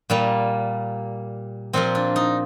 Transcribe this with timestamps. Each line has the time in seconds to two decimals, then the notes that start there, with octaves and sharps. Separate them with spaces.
0.10 A#2 G3 A#3
1.73 A#2 F3 A#3 C4
1.95 D4
2.16 D#4